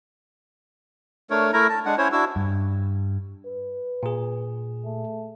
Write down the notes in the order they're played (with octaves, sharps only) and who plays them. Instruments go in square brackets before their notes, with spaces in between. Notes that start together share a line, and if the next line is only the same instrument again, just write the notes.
[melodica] A3 D4 A#4 C#5
A3 E4 A#4 A#5
A5
G#3 D4 F#5
C#4 E4 C5 C#5
D4 E4 F#4 E6
[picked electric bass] G2
[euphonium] B4
[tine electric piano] A#2 G#4
[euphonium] A3